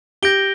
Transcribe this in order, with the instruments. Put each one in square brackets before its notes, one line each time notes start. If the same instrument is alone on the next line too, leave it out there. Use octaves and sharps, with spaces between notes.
[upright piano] G4 [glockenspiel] G6 A#6 D7 G7